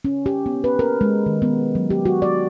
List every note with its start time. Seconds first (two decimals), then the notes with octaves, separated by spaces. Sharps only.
0.05 C#4
0.26 G4
0.46 B3
0.64 B4
0.79 A#4
1.01 G#3
1.26 D#3
1.42 B3
1.75 F#3
1.90 G4
2.05 F#4
2.22 D5